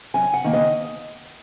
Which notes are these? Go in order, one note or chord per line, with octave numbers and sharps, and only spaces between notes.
F#2 G#5
F#5
D#3 A#3
D#5